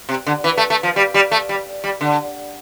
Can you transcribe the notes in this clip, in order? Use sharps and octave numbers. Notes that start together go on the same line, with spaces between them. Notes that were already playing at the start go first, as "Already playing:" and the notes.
C3
D3
E3
A3
A3
F3
G3
G3
A3
G3
G3
D3